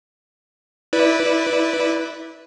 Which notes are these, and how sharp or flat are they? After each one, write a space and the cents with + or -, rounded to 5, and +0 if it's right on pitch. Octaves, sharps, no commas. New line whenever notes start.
E4 -20 B4 +0 D5 +0